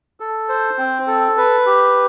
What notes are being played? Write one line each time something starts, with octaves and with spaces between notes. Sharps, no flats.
A4
C5
C4
A4
B4
G4